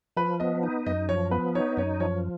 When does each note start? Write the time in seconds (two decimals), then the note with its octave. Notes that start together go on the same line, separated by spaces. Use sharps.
0.17 F3 B4
0.40 B3 D#5
0.63 D#4
0.86 F#2 D#5
1.09 F3 C#5
1.31 B3 B4
1.55 D#4 C#5
1.77 F#2 C#5
2.00 F3 C#5